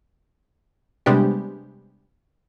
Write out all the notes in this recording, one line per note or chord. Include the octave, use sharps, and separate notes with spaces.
C3 G3 G#3 B3 D4 G4